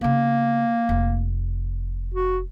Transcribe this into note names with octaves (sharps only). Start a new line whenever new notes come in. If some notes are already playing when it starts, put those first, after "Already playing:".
C#3 A#3 B3
F1
F#4